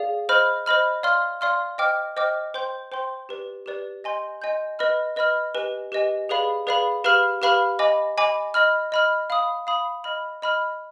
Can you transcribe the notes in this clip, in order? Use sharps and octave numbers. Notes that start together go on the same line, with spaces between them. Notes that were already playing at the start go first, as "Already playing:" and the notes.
Already playing: G#4 D5 F5
C5 D#5 B5 F6
C5 D#5 B5 F6
D5 F5 C6 F6
D5 F5 C6 F6
C5 D#5 G5 D6 F6
C5 D#5 G5 D6 F6
C5 G5 C6 G6
C5 G5 C6 G6
G4 B4 D5
G4 B4 D5
D#5 G#5 C6 G6
D#5 G#5 C6 G6
B4 D#5 B5 F6
B4 D#5 B5 F6
G4 B4 D#5 G#5
G4 B4 D#5 G#5
G#4 B4 D5 F5 B5
G#4 B4 D5 F5 B5
G4 B4 F5 B5 F6
G4 B4 F5 B5 F6
D#5 G#5 B5 D6
D#5 G#5 B5 D6
D#5 B5 F6
D#5 B5 F6
F5 B5 D#6
F5 B5 D#6
D#5 B5 F6
D#5 B5 F6